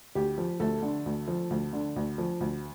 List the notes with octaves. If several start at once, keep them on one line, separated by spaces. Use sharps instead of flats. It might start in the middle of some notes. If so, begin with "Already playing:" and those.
D2 G4
F3
D2 A3 A4
D3
D2
F3
D2
D3
D2
F3
D2